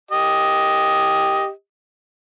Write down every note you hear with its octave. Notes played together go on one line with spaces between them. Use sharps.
G4 D#5